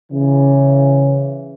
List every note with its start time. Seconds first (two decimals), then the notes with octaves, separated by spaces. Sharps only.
0.11 C#3 E3